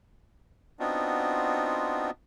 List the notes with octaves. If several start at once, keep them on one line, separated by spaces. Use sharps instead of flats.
B3 C4 D4 D#4 F4 F#4